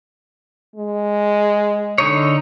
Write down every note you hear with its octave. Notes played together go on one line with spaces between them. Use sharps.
G#3
D3 D#4 C#5